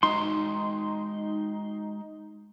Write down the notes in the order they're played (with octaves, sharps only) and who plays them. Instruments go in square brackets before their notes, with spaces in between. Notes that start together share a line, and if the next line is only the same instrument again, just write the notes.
[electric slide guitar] G#3 F#4 A#5 [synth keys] D#4 [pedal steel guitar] C6